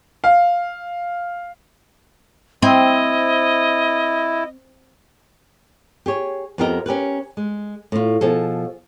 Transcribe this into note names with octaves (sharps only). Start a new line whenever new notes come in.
F5
C4 E4 D#5
G4 G#4 C#5
F2 B3 C4 G4 A#4 D#5
C#4 G4 A#4 B4
G#3
A2 F4
B2 F3 G#4 A4